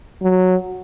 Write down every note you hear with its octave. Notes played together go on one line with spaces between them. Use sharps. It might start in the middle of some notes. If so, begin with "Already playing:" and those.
F#3